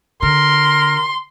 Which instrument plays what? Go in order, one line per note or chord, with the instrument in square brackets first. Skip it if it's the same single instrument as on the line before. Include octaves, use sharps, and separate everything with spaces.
[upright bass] D3 [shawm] A#4 [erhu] C6